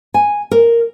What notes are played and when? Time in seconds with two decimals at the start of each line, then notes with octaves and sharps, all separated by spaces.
0.14 G#5
0.51 A#4